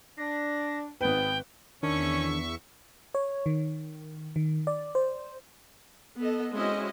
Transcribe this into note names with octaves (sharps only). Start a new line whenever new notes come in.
D4 A#6
G#1 G#2 B3 B4 G5
E2 D#3 C#4 D4 E5 C#6
C#5
D#3
D#3
D5
C5
B3 A4 D#5
G#3 C4 C#4 E4 F#4 D#5